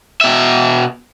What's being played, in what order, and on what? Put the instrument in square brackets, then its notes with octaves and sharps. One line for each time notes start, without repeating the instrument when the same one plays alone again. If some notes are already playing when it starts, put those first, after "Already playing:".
[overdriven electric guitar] B2 E5